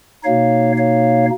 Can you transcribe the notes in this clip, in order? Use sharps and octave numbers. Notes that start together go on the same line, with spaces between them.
B2 A#3 D#4 C#5 F5
C#5 F5